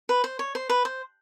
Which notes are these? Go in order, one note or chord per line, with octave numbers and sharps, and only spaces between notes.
B4
C5
C#5
C5
B4
C5